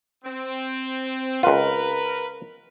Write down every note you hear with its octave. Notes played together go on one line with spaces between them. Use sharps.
C4
C#2 F4 A#4 B4